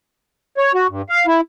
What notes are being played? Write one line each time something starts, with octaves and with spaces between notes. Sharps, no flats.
C#5
F#4
G2
F5
E4